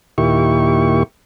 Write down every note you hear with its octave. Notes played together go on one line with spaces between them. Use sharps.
D#2 A#2 E4 G4 C#6